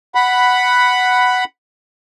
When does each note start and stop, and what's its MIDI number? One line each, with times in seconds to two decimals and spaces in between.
0.15 1.44 78
0.15 1.44 83